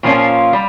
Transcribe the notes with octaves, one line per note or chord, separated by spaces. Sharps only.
A#2 F3 A#3 C#4 F4
G3